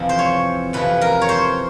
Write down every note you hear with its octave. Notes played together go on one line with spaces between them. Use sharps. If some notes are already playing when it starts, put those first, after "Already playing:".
Already playing: F2 C3 E3
C5
C#5
F2 C3 E3 B4
A#4
C#5
C5